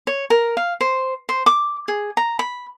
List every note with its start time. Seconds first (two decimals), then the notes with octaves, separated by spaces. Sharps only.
0.07 C#5
0.30 A#4
0.57 F5
0.81 C5
1.29 C5
1.46 D6
1.88 G#4
2.17 A#5
2.39 B5